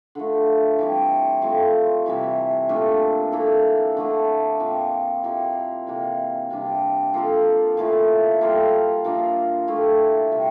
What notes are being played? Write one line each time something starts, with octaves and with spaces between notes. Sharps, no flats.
D3 F3 A3
E3 G3 C4
F3 A3 C4
C3 E3 G3
A#2 A3 D4 A4
E3 A#3 E4 A4
D3 A3 D4
A#2 F3 C4
F3 A#3 E4 G4
C3 E3 A#3
C3 G3 D4
F3 A#3 F4 A4
A#2 F3 A3 E4
G3 A#3 F4 A4
A#2 F3 A#3 D4
A#2 A3 E4 G4
C3 G3 C4